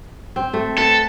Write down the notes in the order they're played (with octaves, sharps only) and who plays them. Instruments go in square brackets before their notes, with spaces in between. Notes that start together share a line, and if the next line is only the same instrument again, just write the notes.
[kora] C4
A3
[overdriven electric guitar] A4 [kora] B4